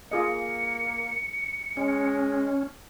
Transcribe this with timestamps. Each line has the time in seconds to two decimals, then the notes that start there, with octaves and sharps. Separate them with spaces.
0.11 A#3 F4 G#4 D#5 C#7
1.77 G#3 C#4